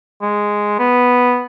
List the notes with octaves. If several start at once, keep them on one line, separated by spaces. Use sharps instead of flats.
G#3
B3